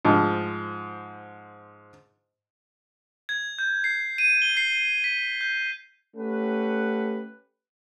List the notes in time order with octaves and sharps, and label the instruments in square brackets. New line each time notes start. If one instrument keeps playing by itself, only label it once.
[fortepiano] G#2 F3
[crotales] G#6
G6
C7
D#7
G7
C7
B6
G6
[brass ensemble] A3 C#4 G4 B4 F#5